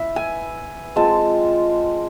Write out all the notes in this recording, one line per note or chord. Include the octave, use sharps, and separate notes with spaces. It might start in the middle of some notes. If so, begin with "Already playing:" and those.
Already playing: B3 E4 E5
G#5
G#3 C4 F4 A5